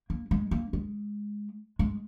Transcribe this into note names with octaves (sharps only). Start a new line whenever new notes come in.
A#3
G#3
A#3
G#3
G#3